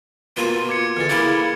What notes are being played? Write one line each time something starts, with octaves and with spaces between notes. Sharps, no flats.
B2 A#3 F4 G#5
D6 G#6 C#7
D3 E3 G#4 F6 A6
C#3 A#3 E4